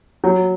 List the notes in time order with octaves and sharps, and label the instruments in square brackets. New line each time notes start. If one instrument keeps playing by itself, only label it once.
[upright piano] F#3